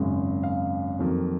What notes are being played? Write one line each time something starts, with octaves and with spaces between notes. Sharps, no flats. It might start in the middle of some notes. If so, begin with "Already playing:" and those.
Already playing: G#1 F#2 C#3 G#3
F5
F2 D#3 F#3 A#3